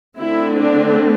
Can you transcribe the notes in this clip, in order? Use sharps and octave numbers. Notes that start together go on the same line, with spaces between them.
D3 A3 C4 E4
D4